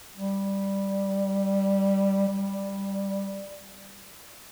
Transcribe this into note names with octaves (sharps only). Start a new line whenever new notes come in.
G3
G3